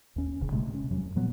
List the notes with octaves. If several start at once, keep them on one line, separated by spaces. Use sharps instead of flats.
D#2 C#4
D1 G1 C#3
A2 C3 G#3 A3
C#4
F2 F#3
A#2 F3 F#3 B3